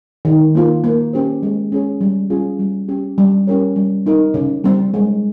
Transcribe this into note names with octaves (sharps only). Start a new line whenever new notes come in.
D#3
A#3 F4
A#3
C#4 G4 C5
G#3
C#4 G#4 C#5
G3
C#4 F4 G#4
G3
C#4 G4
G3
C#4 G4 A#4 C#5
G3
C4 D#4 A#4
C#3
G3 C4
G#3